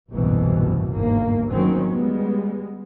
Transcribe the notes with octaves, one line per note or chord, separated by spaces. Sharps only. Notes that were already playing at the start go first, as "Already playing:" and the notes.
F#1 C2 G#2 B2 E3 A3
G1 D#2 G#2 A#3
G1 D#3 F#3 C4 C#4
G3 G#3 B3